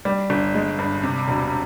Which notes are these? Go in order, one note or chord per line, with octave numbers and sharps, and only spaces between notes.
G3
G1
G#3
G2
C3
E1